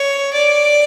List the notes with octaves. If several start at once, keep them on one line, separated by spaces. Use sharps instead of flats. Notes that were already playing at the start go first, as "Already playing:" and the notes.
Already playing: C#5
D5